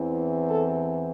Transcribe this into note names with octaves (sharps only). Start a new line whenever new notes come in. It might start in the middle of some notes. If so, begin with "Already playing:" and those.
Already playing: E2 E3 C4
A4